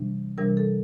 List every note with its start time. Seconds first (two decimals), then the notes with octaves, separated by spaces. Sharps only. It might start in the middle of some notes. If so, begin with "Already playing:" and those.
Already playing: C3 E3 G3 D4
0.38 C3 E3 G3 D4 A#4
0.57 A4